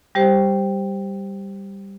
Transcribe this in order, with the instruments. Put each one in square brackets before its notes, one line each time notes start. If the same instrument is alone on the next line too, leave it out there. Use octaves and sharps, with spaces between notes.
[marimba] G3 G4 C5